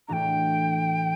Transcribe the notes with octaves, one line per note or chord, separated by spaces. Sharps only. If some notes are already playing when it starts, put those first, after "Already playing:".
A2 E3 A3 D4 F#4 G5 A#5